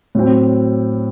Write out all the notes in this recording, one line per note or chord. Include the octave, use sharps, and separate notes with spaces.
A2 F#3 C4